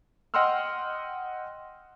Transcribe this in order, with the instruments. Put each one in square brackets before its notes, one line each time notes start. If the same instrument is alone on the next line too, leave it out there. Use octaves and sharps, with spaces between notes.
[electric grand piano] D#5 F#5 G5 C6 E6 F6